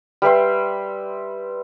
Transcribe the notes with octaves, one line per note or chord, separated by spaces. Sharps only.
G3 B4 E5 C6